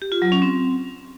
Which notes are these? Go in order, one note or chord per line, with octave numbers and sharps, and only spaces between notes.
G4
F4
F#3
C#4
C4